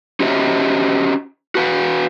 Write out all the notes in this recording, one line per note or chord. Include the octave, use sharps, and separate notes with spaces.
C#4 F#4 G4 C5 D#5 E5
F#4 B4 F5 F#5